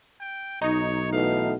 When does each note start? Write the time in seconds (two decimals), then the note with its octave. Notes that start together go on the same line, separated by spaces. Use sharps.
0.20 G5
0.62 B1 D#4 C#5
1.12 B2 E3 A3 F5